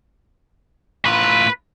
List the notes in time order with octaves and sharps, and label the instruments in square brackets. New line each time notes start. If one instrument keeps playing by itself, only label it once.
[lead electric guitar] A2 F4 [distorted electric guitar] B4